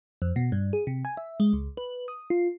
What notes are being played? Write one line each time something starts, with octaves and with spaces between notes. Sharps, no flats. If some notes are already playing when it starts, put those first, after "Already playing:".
F2
B2
G2
G#4
C3
G#5
E5
G#3
C#2
B4
D#6
F4